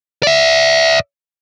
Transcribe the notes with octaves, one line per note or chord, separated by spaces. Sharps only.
D5 E5